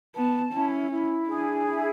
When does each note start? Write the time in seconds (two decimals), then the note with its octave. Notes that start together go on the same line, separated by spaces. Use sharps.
0.15 B3 A5
0.53 C#4 E4
0.90 E4
1.27 D4 G#4
1.66 E4